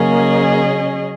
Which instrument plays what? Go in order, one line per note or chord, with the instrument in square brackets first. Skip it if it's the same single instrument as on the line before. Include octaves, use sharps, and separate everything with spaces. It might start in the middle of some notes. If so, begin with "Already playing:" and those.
Already playing: [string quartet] C#3 F#3 C#4 G#4 D#5 [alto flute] A#3